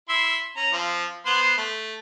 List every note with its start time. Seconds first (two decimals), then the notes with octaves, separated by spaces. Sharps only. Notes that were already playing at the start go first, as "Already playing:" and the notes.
0.09 E4 E5 C6
0.57 C#4 A#5
0.73 F3 C4
1.26 B3 C5 C6
1.57 A3